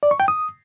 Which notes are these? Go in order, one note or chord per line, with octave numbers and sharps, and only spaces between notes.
D5
C#6
G5
D#6